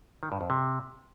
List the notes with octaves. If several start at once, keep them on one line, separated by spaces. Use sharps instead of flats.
D#3
G2
F2
C3